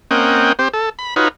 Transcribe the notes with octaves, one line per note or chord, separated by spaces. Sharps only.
A#3 C4 C#4 D#5 F#5 G5
C4 G4 C5
A4
B5
D#4 F4 F#4 B4 C#5